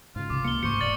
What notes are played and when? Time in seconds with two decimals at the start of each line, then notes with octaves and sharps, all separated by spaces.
0.16 G#2 C#3 F4
0.30 C3 D6
0.44 C#2 A#3 C#7 G7
0.63 G#2 A3 C5 C#6 C#7
0.81 E1 A2 D5 A6 F#7